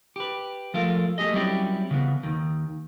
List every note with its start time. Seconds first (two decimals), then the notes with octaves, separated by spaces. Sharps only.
0.16 G4 B4
0.74 F3 G#3 A3 F4 A#4 F5
1.18 A3 G4 G#4 D#5
1.33 F#3 G3 C4 C#4 E4 G4
1.91 C#3 E3 B3
2.23 D#2 D#3